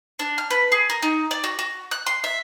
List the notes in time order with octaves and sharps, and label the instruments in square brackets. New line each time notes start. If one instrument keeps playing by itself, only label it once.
[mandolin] D4
F6
B4
G#4
A#4
D#4
D5
F#4
F#4
F#6
C6
E5